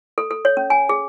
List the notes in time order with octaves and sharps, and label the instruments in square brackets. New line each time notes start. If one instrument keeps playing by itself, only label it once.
[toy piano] A4
A4
C#5
C#4
G#5
G#4